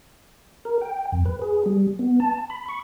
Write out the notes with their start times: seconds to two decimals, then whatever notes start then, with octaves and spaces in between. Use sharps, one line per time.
0.65 A#4
0.81 G5
1.12 F2
1.25 B4
1.42 G#4
1.66 G3
1.99 B3
2.20 A5
2.50 B5
2.69 C#6